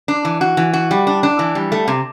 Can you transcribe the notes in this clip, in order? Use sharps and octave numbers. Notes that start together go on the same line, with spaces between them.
D4
E3
F#4
E3
F#4
G3
D4
D4
E3
G3
A3
C3